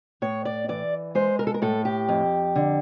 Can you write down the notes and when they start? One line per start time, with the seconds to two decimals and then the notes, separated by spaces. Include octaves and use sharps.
0.22 A2 C#5
0.45 D5
0.69 E3 D5
1.15 G#3 C5
1.39 A#4
1.47 A4
1.54 A#4
1.62 A2 A4
1.85 G4
2.09 F2
2.56 D3